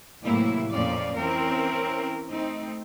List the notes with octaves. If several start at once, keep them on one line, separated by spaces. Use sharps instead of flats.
A2 C3 E3 F#3 A#3 E4
F2 A#2 F3 C#4 D5 F5
E3 C4 C#4 A#4
A3 C4 D#4